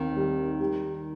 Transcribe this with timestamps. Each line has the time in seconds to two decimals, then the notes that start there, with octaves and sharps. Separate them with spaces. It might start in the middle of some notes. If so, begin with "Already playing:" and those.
Already playing: D#2 D#3 C4
0.16 G3
0.60 G3